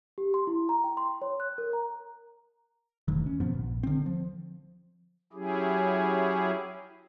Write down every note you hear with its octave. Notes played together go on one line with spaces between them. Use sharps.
G4
C6
E4
A#5
G5
C6
C#5
F#6
A#4
A#5
E1 D2 D#3
C#4
G2 B2 F3 B3
A#1
D3 C4
F3
F#3 C#4 E4 G4 G#4